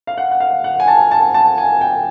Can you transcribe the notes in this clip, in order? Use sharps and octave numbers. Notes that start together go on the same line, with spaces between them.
F5
F#5
F#5
F5
F#5
G#5
A5
A5
A5
G#5
G5